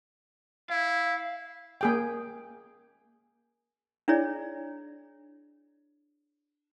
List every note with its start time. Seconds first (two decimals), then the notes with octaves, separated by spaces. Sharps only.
0.70 E4 F5
1.81 A#3 G#4 G5
4.08 D4 E4 G#4 C#5 D5